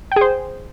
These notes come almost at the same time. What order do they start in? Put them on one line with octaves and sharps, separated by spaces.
G5 G#4 C5